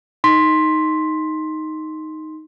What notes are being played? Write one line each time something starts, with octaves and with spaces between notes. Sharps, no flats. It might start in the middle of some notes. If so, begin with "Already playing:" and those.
D#4 C6 B6